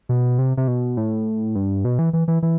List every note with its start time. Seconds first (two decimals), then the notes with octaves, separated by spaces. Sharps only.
0.09 B2
0.39 C3
0.57 C3
0.68 B2
0.97 A2
1.55 G2
1.85 B2
1.99 E3
2.13 E3
2.28 E3
2.43 E3